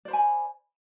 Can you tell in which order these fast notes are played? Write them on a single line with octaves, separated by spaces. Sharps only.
D5 C5 B5 G#5